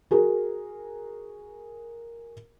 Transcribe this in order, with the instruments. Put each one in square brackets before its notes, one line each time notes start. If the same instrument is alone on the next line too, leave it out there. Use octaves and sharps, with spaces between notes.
[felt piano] F#4 G#4 A#4